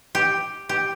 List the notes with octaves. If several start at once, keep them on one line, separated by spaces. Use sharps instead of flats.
G4
G4